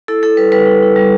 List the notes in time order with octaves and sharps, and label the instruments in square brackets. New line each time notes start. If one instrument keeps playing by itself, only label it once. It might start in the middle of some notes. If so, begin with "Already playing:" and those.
[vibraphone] E4 A4
E4 A4
G3 B4
G3 B4
E4
E4
G3